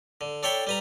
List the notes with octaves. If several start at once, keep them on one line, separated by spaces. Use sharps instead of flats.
D3
D4 A4 C#5 G5 B5 C#6
G3 B4 A#5